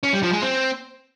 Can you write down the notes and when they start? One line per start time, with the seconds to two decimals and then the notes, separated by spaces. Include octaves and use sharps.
0.03 C#4
0.13 G3
0.23 F3
0.32 G#3
0.42 C4